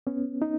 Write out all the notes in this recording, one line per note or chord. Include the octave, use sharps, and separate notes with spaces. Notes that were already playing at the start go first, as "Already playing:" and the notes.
B3 C#4
D#4